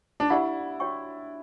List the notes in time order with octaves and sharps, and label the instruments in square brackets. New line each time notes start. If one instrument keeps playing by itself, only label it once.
[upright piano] D4
[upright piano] E4 [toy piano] G4 D5 F#5 B5
[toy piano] F#4 C#5 G5 C#6